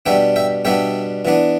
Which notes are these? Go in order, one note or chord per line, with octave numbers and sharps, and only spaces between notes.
B2 G3 B3 D4 E5 G5
E5 G5
B2 G3 B3 D4 E5 G5
E3 B3 D4